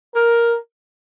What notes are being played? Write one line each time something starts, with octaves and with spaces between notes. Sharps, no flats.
A#4